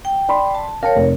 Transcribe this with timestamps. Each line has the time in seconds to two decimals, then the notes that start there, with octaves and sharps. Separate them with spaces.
0.05 G5
0.29 D5 B5 C6
0.55 A5
0.83 A#4 C#5 F5 G5 A5
0.96 F1